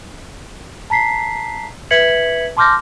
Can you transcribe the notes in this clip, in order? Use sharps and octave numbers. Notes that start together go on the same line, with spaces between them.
A5 A#5 B6 C7
B4 E5 G#6 B6 C#7 F#7
A5 C6 D6 F6 G6 A#6